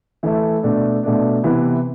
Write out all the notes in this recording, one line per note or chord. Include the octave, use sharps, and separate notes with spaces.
E3 A3 E4 A4
B2 A3 D4
B2 A3 D4
C3 E3 B3 E4 B4